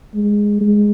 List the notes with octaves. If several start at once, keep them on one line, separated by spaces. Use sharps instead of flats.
G#3
G#3